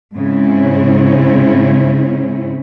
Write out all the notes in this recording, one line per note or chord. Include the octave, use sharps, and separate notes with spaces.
G#2 C#3 C4 C#4 E4